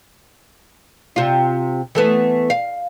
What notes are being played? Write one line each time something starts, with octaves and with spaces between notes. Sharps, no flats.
C3 F4
E3 A3 B3
F5